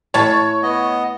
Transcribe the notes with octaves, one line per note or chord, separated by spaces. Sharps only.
A2 C#5 A5
B3 D#5